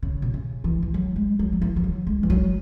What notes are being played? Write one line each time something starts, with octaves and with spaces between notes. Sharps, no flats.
C#3
B2
C#3
E3
E3
F#3
G#3
F#3
F#3
E3
E3
F#3
G#3
E3
F#3